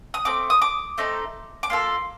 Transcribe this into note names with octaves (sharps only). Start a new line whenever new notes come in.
D#6
A3 C4 D6
D#6
D6
A3 C4 D#4 A4
D6
A#3 F4 A4 C6